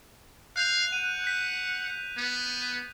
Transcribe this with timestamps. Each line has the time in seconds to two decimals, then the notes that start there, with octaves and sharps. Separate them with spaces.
0.56 F5 F#6 G6 F7
0.92 F#5 D#7
1.24 G6 B6
2.17 B3